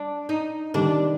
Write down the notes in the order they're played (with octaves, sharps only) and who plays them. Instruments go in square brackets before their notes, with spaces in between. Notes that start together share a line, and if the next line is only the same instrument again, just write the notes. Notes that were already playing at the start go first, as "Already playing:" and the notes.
Already playing: [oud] D4
D#4
[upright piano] D#3 G3 [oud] D4